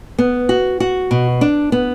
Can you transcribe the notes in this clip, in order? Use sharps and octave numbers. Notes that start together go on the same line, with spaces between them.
B3
F#4
F#4
B2
D4
B3